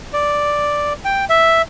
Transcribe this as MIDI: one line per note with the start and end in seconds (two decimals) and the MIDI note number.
0.13 0.93 74
1.05 1.25 79
1.29 1.62 76